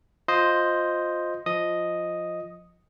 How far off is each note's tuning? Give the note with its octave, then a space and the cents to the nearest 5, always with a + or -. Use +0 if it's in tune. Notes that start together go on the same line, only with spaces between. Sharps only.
F4 +15 C5 +0 D#5 +0
F3 +0 D#5 +0 D#6 +0